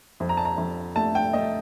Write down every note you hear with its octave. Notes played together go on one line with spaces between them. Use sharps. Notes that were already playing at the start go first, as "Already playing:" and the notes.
F2
A#5
A5
A#5
F2
A3 A5
G5
A3 D#5